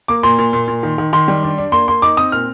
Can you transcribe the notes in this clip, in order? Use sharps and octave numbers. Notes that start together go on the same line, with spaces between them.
A#3 D6
A#2 C6
A#2
A#2
A#2
D#3
D#3
D#3 C6
G3
D4
D4
A#3 C6
A#3 C6
D#4 D6
C4 D#6
A#2 F6